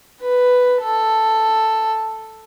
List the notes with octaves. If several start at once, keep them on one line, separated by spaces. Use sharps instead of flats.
B4
A4